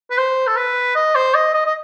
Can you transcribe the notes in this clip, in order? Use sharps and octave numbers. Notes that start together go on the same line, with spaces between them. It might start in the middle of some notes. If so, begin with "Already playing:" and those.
B4
C5
A4
B4
D#5
C5
D#5
D#5
D#5